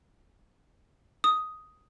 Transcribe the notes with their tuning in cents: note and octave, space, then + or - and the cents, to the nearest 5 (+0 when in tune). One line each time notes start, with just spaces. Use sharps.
D#6 +5